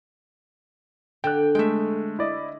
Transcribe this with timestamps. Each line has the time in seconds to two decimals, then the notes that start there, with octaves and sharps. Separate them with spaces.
1.24 D3 G5 F#6
1.55 G#3 A3 E5 G5
2.19 E4 D5 D#5